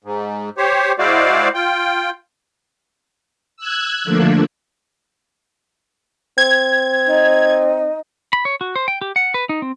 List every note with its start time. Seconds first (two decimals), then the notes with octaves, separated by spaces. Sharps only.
0.04 G#2
0.58 G4 C5 C#5
0.99 G#3 E4 F#4 C5 D5 F5
1.54 F4 G5
3.57 E6 F#6 G#6
4.04 D3 F3 A3 A#3 D4
6.38 C4 G#6
7.07 D#4
8.33 B5
8.45 C#5
8.61 F#4
8.76 C5
8.88 G5
9.01 G4
9.16 F#5
9.34 B4
9.49 D#4
9.62 C4